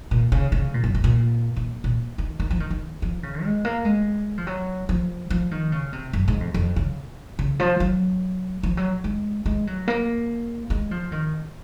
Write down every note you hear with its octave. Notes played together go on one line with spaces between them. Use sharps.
A#2
C#3
C#3
A#2
F#2
G#2
A#2
A#2
A#2
D#3
D#3
F3
D#3
D#3
F3
C#3
G#3
A#3
G#3
F3
F#3
F3
F3
D#3
C#3
C3
F#2
G#2
F2
F2
C#3
C#3
F3
F#3
F3
F#3
G#3
G#3
F#3
A#3
G#3
F3
D#3